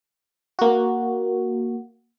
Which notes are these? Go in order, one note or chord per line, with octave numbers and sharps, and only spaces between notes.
A#3 F#4